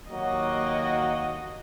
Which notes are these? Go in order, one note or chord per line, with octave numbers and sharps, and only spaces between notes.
D#2 D#3 F#3 A#3 F#4 D#5